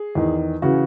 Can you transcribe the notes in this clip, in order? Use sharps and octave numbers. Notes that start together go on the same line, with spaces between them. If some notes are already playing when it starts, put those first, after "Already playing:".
Already playing: G#4
E2 D#3
C#3 E3 F#4